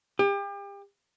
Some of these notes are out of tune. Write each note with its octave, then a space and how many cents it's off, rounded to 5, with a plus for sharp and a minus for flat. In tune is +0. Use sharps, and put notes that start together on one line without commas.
G4 +35